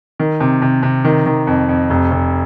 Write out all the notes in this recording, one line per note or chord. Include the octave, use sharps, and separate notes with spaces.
D#3
C3
C3
C3
D#3
D#3
F2
F2
F1
F1